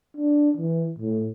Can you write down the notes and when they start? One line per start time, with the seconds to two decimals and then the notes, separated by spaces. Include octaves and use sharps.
0.17 D4
0.57 E3
0.99 A2